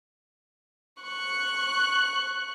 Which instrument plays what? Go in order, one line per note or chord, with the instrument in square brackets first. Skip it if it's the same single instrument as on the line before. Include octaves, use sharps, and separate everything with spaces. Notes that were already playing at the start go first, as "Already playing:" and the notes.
[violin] C#6 F#6